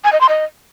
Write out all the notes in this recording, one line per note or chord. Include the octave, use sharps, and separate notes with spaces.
G#5
D#5
C6
D#5